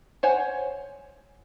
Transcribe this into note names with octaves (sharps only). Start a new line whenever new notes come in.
C5 C#5 F#5 G#5